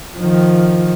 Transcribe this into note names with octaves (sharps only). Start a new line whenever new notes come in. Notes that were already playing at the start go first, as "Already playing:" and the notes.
D#3 F3